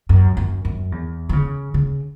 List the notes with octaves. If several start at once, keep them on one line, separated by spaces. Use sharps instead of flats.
F#2
F#2
F#2
E2
E3
C#3
C#3